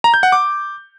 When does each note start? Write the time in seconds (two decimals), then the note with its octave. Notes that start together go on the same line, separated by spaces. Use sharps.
0.04 A#5
0.14 G6
0.23 F#5
0.32 D6